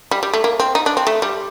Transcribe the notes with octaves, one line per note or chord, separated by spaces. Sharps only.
G3
G3
A3
A#3
C4
D#4
D4
C4
A3
G3